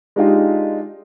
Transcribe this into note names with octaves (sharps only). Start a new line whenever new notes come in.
G#3 D4 D#4 F4 G4